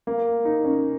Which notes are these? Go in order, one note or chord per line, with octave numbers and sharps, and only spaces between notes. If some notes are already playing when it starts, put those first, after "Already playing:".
A#3
D#4
C#4